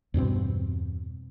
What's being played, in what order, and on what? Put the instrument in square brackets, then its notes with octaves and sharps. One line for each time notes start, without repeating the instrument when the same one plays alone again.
[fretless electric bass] E2 G2 B2 C4